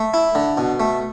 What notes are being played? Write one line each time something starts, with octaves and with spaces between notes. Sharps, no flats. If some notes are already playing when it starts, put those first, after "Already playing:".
Already playing: A3
E4
D3
B2
A3